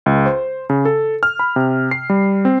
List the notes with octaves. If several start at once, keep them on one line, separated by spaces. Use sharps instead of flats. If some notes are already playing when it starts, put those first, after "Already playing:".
C#2
C5
C#3
A4
F6
B5
C3
C7
G3
C4